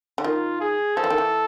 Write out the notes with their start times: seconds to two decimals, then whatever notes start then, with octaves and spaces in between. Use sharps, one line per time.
0.18 D3
0.24 D#3 F4
0.61 G#4
0.96 F3 A4
1.04 E3
1.10 D#3
1.18 E3